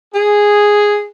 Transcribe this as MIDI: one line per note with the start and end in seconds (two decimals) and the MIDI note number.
0.14 1.06 68